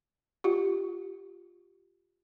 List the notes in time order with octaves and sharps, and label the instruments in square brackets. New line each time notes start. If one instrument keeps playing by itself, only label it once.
[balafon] F4 G4